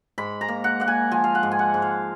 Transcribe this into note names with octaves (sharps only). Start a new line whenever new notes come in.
G#2 B5
A#5
A#3
F#5
A#3 F#5
G#5
F3 G#5
F5
F#5
G#2
G#5
F#5
G#2
F5